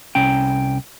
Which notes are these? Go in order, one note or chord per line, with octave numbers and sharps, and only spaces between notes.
C2 C#4 G5